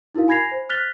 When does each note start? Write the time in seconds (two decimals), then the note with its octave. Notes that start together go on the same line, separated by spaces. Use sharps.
0.15 D#4 E4 F#4 A#4 F5
0.28 G#5 B5 G#6 A#6 C7 F7
0.52 C5
0.69 F6 F#6 A6 B6 F7 G7